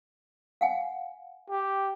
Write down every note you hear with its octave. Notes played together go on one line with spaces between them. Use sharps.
F5 F#5 G#5
G4